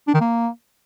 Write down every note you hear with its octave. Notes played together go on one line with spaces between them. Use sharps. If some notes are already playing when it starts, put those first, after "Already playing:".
D4
D#3
A#3